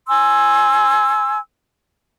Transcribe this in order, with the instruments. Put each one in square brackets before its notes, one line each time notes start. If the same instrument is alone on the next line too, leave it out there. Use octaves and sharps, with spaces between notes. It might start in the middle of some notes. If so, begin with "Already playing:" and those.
[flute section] G#5 C6 E6